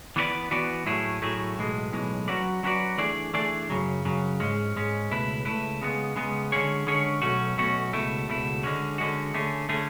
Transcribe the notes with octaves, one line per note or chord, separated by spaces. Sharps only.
E3 B3 F#4 B4 D5
E3 B3 F#4 B4 D5
A2 F#3 A3 E4 G#4
A2 F#3 A3 E4 G#4
B1 A2 E3 G#3
B1 A2 E3 G#3
F#3 C#4 F#4 B4 D5
F#3 C#4 F#4 B4 D5
E3 A3 D4 G#4 D5
E3 A3 D4 G#4 D5
F#2 C#3 F#3
F#2 C#3 F#3
G#2 G#3 C#4
G#2 G#3 C#4
C#2 B2 A3 E4 B4
C#2 B2 A3 E4 B4
C#3 G#3 B3
C#3 G#3 B3
D3 G#3 C#4 G#4 C#5
D3 G#3 C#4 G#4 C#5
B1 B2 A3 C#4 F#4
B1 B2 A3 C#4 F#4
C#2 B2 A3 E4
C#2 B2 A3 E4
D3 G#3 C#4 F#4
D3 G#3 C#4 F#4
D3 A3 C#4 G#4
D3 A3 C#4 G#4